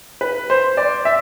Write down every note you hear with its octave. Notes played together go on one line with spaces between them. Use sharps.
B4
C5
D5
E5